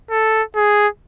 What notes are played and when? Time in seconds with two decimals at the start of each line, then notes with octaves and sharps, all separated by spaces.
0.11 A4
0.56 G#4